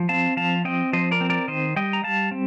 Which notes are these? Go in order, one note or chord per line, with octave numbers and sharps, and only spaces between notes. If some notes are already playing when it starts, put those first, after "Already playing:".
Already playing: F3
C4 F5 A5
F3 F5 A5
C4 D#5 G5
F3 C5 D#5
A#4 D5
C4
A#4 D5
D#3 C5 D#5
G3 D#5 G5
A#5
G3 F5 A5
C4